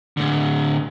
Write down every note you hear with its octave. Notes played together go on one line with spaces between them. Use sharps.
A2 D3